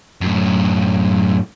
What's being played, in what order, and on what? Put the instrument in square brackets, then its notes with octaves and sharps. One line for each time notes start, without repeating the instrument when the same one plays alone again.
[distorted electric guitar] F#2 A2